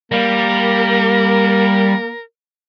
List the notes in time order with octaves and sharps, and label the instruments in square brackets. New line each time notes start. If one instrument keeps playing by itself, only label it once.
[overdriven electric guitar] G3 [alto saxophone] A#3 [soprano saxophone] A#4